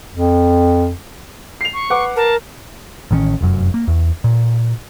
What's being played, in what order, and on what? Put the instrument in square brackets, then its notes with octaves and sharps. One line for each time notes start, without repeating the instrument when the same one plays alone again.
[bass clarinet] F2
[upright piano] C7 F7
[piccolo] C#6
[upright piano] B4 F#5 D6
[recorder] A#4 [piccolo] A5
[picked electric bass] A1 D#3 G#3 C#4
F1 F#2
A#3
E2
A#2